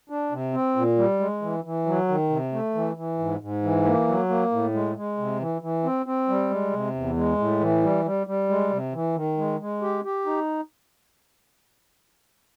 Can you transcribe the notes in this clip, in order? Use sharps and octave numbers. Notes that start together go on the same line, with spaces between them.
D4
C3
C4
A#2
G3
G#3
E3
E3
F#3
D#3
C3
A3
E3
E3
G#2
G#2
E3
A#3
F#3
A#3
A2
G#3
G#3
C3
E3
E3
C4
C4
G3
G#3
C3
E2
G#3
A2
E3
G3
G3
G3
G#3
C3
E3
D#3
G#3
G#3
G4
G4
D#4